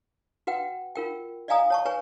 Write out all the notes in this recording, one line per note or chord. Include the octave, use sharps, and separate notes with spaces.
F#4 B4 F#5 G5
F4 A#4 G5
D5 D#5 F5 G#5 A#5 D#6
C#5 A5 C#6
B4 C#5 G#5 C#6